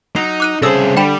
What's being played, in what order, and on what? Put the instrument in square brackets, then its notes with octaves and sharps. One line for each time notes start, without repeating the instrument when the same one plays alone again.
[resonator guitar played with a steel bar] F#3 [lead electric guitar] D#4 [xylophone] C7
[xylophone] D6 F#6 D#7
[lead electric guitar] C2 G#4 [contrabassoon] C#3 [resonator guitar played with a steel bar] A4 C5 [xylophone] D#6 E6 A#6
[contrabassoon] D3 [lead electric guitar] G3 [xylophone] G5 B5 E7